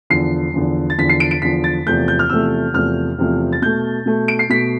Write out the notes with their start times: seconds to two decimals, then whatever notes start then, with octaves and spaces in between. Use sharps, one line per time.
0.10 E2 D3 F3 C7
0.54 E2 D3 F3
0.90 A6
0.98 E2 D3 F3 B6
1.09 C7
1.20 D7
1.31 D7
1.42 E2 D3 F3 B6
1.64 A6
1.86 E2 C3 F3 A3 G6
2.08 G6
2.19 F6
2.30 E2 C3 F3 A3 E6
2.73 E2 C3 F3 A3 F6
3.18 E2 C3 F3 A3
3.53 A6
3.62 B2 A3 G6
4.06 B2 A3
4.28 D7
4.39 C7
4.49 B2 A3 B6